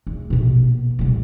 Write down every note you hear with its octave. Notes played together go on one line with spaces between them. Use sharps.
E2
A#1 B2
D#1 C2